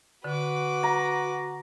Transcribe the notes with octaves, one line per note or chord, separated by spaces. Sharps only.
D3 F#4 B4 D6
A#5